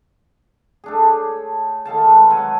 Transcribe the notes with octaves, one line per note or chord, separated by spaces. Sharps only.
A3 D4 G#4
C#5
D#3 A4 F5 A5
G#3 B4
F#3 C#5 G#5 A5